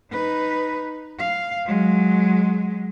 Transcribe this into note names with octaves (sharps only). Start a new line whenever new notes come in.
D#4 B4
F5
F#3 G#3